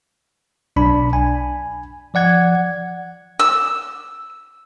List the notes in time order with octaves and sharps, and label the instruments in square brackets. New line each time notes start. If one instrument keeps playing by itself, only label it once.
[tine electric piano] B1 D4 B5
G#5
F3 D5 F#5 G#6
[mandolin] E6